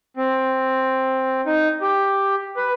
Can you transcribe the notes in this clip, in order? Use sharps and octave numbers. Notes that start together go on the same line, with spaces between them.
C4
D#4
G4
B4